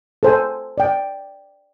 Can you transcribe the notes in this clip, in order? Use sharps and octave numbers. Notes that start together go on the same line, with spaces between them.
A4 C5 G#5
D5 G5